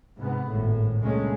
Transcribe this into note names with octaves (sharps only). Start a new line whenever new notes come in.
G#2 C3 B3
G#1 A2
C#2 G2 A#2 G#3 A3 C#4